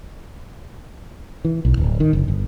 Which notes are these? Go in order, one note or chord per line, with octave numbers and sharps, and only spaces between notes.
E3
B1
D1
D#3
F#1
G1